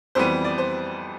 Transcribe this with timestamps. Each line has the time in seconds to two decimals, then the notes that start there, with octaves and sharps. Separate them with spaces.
0.15 F2 E3 G3 B3 C5
0.44 D5
0.58 C5